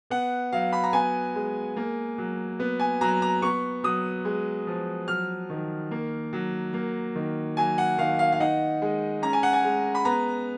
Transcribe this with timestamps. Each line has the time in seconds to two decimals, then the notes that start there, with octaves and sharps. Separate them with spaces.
0.10 B3 F#5
0.52 F#3 F5
0.73 B5
0.84 A#5
0.93 B3 G#5
1.35 G#3
1.76 A#3
2.18 F#3
2.60 B3
2.80 G#5
3.01 F#3 A#5
3.22 A#5
3.42 B3 C#6
3.84 F#3 D#6
4.25 G#3
4.67 F3
5.08 F#3 F6
5.50 D#3
5.91 A#3
6.33 F#3
6.74 A#3
7.15 D#3
7.57 F#3 G#5
7.78 F#5
7.98 D#3 F5
8.19 F5
8.32 F5
8.40 D#4 F#5
8.82 G#3
9.22 C#4 A#5
9.33 G#5
9.43 F#5
9.53 G#5
9.64 G#3
9.95 B5
10.05 B3 A#5